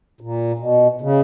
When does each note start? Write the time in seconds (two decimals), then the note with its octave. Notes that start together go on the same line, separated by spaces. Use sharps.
0.21 A#2
0.58 B2
1.01 C#3